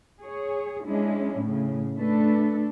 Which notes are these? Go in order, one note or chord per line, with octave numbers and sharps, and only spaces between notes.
G#4 C#5
G#3 C#4 D4 E4
A2 C#3
A3 D4 A4 B4